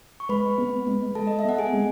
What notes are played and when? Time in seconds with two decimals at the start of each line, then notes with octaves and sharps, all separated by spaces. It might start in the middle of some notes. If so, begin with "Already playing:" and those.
0.20 C#6
0.29 G#3 B4 B5
0.58 B3
0.87 G#3
1.15 G#3 A4 A5
1.27 D#5
1.39 E5
1.45 B3 F#5
1.59 G#4 G#5
1.73 G#3